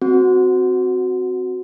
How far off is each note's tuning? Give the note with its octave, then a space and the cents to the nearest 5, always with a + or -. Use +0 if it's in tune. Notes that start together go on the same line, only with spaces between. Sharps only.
C4 -10 F#4 +0